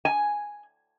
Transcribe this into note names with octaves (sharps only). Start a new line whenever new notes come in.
G#5